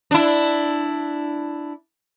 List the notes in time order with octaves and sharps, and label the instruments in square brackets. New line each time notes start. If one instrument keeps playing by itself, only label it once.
[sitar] D4 E4